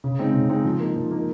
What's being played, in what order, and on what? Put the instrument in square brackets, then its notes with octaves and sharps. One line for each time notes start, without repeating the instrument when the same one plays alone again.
[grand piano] C#3
G#3 C4 D#4
C#3
G#3 C4 D#4
F3
A#3 D#4
F3
A#3 D#4